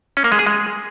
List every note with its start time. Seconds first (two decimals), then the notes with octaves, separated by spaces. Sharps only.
0.17 C#4
0.24 A#3
0.32 G#3
0.39 G#4
0.47 G#3